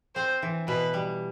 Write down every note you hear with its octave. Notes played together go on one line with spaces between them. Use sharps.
C4 C5
E3
B2 B4
G3